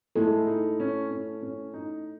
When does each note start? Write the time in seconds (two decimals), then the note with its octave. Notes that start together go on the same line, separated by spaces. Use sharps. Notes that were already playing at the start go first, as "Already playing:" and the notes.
0.16 G#3 A3 E4 A4
0.47 D#4
0.80 C#4
1.11 C#4
1.42 C#4
1.74 D#4